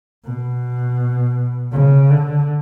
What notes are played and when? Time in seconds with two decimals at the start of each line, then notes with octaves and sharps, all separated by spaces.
0.24 B2
1.72 C#3
2.10 D3